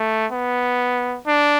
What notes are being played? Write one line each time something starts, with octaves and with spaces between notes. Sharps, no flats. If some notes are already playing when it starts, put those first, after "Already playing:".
Already playing: A3
B3
D4